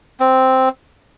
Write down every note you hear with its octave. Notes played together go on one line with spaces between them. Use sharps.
C4